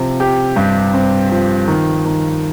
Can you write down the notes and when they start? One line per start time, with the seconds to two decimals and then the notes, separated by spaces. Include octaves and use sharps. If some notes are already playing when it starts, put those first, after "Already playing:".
Already playing: C3 F3
0.20 G4
0.56 G2
0.94 C4
1.32 F3
1.68 D#3
2.05 D#3